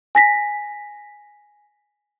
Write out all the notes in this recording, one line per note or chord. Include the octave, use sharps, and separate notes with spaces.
G#5 A#6 B6